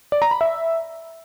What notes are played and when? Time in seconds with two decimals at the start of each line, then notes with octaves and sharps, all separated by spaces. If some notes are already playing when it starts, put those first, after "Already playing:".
0.12 D5
0.22 A#5
0.31 B5
0.41 E5